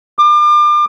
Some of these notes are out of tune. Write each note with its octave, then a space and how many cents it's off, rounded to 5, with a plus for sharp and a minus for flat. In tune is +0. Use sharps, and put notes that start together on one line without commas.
D6 +35